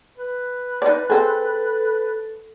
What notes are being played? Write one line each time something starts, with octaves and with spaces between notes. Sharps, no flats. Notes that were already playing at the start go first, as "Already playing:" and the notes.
B4
D#4 D5
C4 G#4 A4